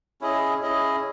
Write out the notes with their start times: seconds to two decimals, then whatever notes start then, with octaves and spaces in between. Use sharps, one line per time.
0.21 C#4 E4 G#4 D#5
0.62 C#4 E4 G#4 D#5